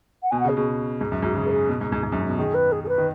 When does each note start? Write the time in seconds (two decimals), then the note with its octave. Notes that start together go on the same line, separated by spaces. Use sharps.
0.23 F#5
0.31 B2 G#5
0.40 F#5
0.45 C#3 G#4
0.57 B2 G#4
1.01 G#2
1.12 F#2
1.23 G#2 F#4
1.35 C#3 G#4
1.47 B4
1.51 G#4
1.69 B2
1.81 G#2
1.92 G#2
2.03 G#2
2.12 F#2
2.21 G#2
2.29 B2
2.38 D#3 G#4
2.54 B4
2.72 G#4
2.84 G#4
2.89 B4
2.98 D#3